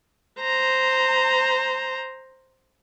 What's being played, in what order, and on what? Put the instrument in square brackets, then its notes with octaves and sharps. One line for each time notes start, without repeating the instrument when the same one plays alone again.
[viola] C5 A#5